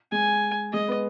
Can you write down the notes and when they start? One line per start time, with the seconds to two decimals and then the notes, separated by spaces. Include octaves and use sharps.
0.12 G#3 G#5
0.72 G#3 D#5
0.88 B3